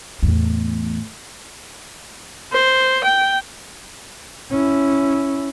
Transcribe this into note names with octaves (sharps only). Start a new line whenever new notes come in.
E2 A2
C5
G5
C#4 E4